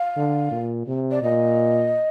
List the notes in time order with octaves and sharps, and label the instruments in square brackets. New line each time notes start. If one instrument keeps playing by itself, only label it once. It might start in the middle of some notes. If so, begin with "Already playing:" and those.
Already playing: [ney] F5
[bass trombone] D3
A#2
C3
[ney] D5
[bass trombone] A#2 [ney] D#5